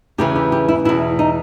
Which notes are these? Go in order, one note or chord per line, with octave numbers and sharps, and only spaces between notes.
E2 C#3 E3 G4
G4
G4
E4
E2 B2 E4
D#4